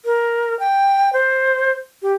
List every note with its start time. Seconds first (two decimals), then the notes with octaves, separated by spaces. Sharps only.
0.05 A#4
0.60 G5
1.13 C5
2.02 G4